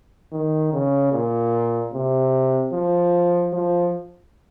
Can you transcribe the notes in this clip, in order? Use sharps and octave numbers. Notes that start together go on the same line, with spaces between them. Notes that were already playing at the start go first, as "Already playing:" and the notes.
D#3
C#3
A#2
C3
F3
F3